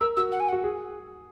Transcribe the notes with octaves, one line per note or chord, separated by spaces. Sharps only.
A#4 E6
F#4 E6
F#5
G#5
F#5
F#4
G#4